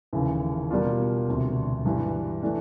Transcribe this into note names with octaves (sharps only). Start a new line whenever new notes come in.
F1 D#2 C#3 E3
B2 G3 A#3 D4 F4
E1 D2 C3
G2 E3 G3
E3 A3 D4